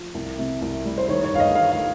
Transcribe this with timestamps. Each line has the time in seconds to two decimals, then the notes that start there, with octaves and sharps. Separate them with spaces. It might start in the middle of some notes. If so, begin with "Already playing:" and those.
Already playing: F3
0.15 C2
0.39 C3
0.62 C2
0.85 G3
0.98 C5
1.08 D#3 C#5
1.24 C#5
1.32 G1 F5
1.40 D#5
1.55 D#3 F5
1.72 F5
1.79 D#3